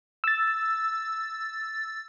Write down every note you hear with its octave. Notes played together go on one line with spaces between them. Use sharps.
E6 A6